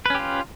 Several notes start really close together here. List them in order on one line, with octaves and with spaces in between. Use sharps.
B4 C#4 G4 F4